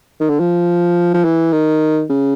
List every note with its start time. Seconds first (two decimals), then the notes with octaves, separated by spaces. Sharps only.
0.20 D#3
0.30 D3
0.40 F3
1.14 F3
1.25 E3
1.52 D#3
2.09 C#3